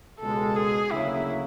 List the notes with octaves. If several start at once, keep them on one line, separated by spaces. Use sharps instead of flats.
C#2 B2 G#3 A4
G#4
D2 C#3 F#3 A#3 E4